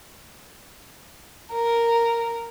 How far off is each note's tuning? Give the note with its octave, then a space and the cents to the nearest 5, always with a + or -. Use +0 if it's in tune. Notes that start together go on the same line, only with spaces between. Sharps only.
A#4 -5